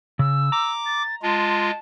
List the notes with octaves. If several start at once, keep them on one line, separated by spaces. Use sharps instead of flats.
C#3 E6
A#5 D6
A6
G#3 F4 A5